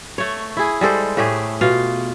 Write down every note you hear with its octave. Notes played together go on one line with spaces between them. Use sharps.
A3 C#5
E4 G#4
G3 G#3 A4 C5
A2 A3 G4 G#4
B2 F4 F5